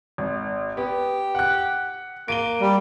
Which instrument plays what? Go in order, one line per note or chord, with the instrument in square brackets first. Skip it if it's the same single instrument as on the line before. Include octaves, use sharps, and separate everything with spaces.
[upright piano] G#1
[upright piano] B3 [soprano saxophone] G4
[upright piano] F#5 F#6
[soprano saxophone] A#3 [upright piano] D7 D#7 G7
[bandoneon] G3